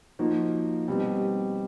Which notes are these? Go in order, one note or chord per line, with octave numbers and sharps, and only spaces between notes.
F3 A#3 D#4 F#4
B2 G3 C4